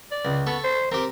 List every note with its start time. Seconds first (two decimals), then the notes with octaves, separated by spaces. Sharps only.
0.11 D5
0.25 C#2
0.47 B3 A4 C#6
0.64 C5
0.92 C4 G4 A#4